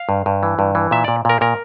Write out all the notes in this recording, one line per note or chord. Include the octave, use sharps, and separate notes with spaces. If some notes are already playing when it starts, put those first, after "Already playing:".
Already playing: F5
G2
G2
E3
G2
E3
A#2 E5
A#2 D5
A#2 A#4
A#2 A#4